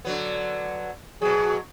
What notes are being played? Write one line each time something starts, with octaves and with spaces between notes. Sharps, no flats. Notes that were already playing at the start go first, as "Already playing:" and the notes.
D3 F#3 B3
B2 F#3 G#4